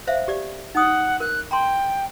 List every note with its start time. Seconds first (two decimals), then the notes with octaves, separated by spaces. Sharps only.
0.07 C5 E5 F5
0.28 G4 D5
0.75 D#4 F#5 D#6
1.20 A#4 F#6
1.51 G5 A#5 C6